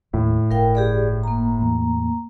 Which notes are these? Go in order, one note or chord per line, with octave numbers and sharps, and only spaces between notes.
E1 D#2 A2
G1 A#4 F5 G5
G4 G#4 D5
A#3 A#5
E2 A2